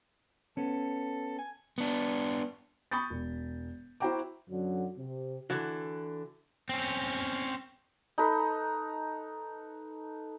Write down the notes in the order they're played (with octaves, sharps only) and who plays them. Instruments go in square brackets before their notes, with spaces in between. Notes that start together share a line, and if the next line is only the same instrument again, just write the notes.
[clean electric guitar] B3 C#4 [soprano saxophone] A4
[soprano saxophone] G#5
[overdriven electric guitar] B3 D4
[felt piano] B5 C#6 D#6 G6 A6
E1
E4 F#4 C5 G5 A#5 D6
[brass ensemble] F#2 D3 F#3
C3
[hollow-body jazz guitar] D3 E3 F#4
[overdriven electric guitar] C4 C#4
[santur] D#4 A4 B4